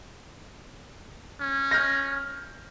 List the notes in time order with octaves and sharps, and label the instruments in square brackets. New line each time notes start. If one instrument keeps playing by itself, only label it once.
[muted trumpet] C#4
[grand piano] F6 G6 A#6